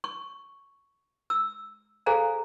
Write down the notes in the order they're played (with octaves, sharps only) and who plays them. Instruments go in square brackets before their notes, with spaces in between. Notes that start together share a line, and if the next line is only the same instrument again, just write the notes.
[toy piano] C#6
E6
G#4 A4 C5 F5 G#5 A#5